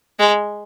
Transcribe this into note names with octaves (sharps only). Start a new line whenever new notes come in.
G#3